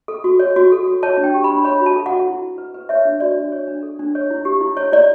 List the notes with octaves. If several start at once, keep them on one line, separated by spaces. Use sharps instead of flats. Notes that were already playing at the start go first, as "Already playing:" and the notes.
A4
F#4
C#5
F#4
A4
F#4
C#5 A5
D4
G5
G4
B5
D4
C#5 B5
F#4
A5
A4
F#5
F#4
E4
E4
B4
B4
C#5 E5
D4
F#4 D5
D4
C#5
D4
A4
D4
C#5
E4
G4
E4
E4 C#5
E4 D5